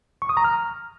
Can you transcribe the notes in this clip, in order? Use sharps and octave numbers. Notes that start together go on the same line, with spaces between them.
C#6
D#6
A#5
F6